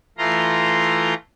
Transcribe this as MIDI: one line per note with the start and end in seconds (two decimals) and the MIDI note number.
0.18 1.14 52
0.18 1.14 57
0.18 1.14 65
0.18 1.14 82
0.18 1.14 84